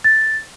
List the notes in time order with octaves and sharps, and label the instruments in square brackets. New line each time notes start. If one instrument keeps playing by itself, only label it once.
[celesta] A6